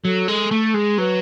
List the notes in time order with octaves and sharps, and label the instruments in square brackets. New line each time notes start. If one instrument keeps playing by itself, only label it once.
[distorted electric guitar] F#3 [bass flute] A4
[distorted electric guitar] G#3
A3
G#3
[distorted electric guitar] F#3 [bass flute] B4